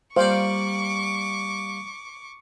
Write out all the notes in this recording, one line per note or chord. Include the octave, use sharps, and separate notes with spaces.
G3 A#3 C5 D5 F5 C#6 D6